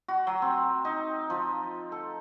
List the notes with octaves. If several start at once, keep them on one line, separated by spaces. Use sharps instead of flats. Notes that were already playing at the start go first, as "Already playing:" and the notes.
F#4
F#3
C4
D#4
F3
A4